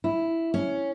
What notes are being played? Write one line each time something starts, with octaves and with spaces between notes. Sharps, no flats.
E4
C#4